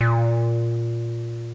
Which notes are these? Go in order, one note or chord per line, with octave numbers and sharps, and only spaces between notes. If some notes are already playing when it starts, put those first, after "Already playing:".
A#2